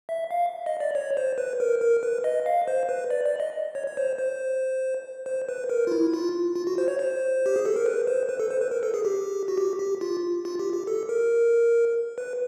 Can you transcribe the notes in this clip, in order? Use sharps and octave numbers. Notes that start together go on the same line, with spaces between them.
E5
F5
D#5
D5
C#5
C5
B4
A#4
A#4
B4
D#5
F5
C5
B4
D5
D5
D#5
C#5
C#5
C5
C5
C5
B4
A#4
F4
E4
F4
F4
F#4
C5
C#5
C5
G4
G#4
A4
A#4
B4
C5
B4
A4
C5
B4
A#4
A4
G#4
G4
F#4
G4
G4
F4
F4
G4
G4
A4
A#4
B4